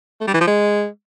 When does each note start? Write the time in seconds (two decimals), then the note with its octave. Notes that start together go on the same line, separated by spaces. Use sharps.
0.21 A3
0.27 G3
0.34 E3
0.41 F3
0.47 G#3